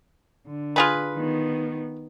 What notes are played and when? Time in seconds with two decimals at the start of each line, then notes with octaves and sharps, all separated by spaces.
0.47 D3
0.76 F4 G#4 B4
1.16 D#3 B3